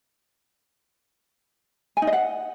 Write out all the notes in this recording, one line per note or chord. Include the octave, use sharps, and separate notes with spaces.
G#5
D#4
D#5
F#5